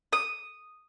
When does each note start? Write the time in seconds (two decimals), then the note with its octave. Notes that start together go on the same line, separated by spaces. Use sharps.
0.13 D#6